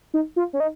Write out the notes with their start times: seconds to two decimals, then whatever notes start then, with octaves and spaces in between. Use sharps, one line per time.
0.14 D#4
0.36 F4
0.53 C#4
0.60 D#4